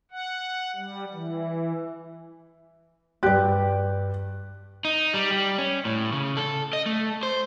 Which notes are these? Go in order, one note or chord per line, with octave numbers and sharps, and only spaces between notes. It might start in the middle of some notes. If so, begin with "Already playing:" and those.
F#5
G3
E3
G2 G4 D5 F#6
D#4
G3
G3
C#4
A2
C#3
A4
D#5
A3
C5